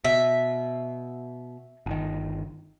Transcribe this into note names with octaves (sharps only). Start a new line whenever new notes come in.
B2 E5
G1 D#3